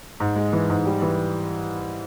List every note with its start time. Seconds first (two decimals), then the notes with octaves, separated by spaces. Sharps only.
0.20 G#2
0.36 G#3
0.53 E3
0.70 G#2
0.86 G3
1.02 E3